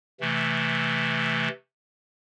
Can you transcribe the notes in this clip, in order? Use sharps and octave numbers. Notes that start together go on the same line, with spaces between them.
C3 E3 A3